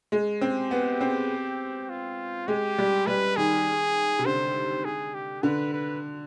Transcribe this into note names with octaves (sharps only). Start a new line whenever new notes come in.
G#3
C4 G4
B3
C4
F4
G#3 G4
G3
G3 B4
D#3 G#4
C3
D3 C5
G#4
G4
D3 B4
B4